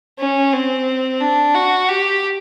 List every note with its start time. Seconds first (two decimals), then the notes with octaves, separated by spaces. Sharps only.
0.19 C#4
0.53 C4
1.21 D4
1.55 F#4
1.89 G4